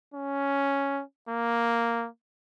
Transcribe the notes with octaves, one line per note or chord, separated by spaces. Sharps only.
C#4
A#3